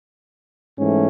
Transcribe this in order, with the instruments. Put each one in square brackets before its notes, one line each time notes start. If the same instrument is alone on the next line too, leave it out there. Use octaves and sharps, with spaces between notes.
[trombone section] G#2 E3 A3 C#4